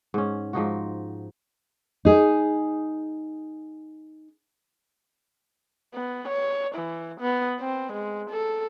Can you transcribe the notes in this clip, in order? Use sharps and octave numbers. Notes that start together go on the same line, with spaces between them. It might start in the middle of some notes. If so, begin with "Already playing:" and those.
G#2 C#4
G#2 F3 D#4 F#4
D#4 G#4
B3
C#5
E3
B3
C4
G#3
A4